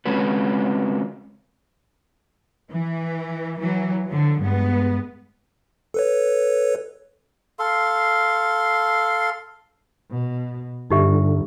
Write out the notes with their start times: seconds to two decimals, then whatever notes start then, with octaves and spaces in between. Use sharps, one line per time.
0.05 C#3 G#3 C4 C#4 F#4 B4
2.71 E3
3.60 E3 F#3
4.07 D3 F3 F#3
4.40 G2 G#3 B3
5.94 A4 B4 C#5
7.59 A4 F5 C6
10.10 B2
10.90 G1 G2 D3 D#4 G4 E5